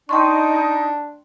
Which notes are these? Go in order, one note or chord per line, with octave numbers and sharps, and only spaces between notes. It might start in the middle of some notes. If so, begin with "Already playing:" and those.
D4 D#4 G5 C6 C#6